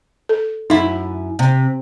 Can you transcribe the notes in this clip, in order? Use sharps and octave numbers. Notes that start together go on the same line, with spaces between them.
A4
F#2 D#4 E4
C3